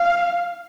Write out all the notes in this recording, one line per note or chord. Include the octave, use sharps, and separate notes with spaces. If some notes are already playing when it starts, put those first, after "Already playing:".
Already playing: F5